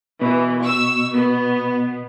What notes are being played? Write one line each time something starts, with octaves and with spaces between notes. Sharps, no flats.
B2 E3
C#6 E6
B3